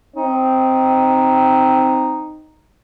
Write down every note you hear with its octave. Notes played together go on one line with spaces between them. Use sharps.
C4 D#4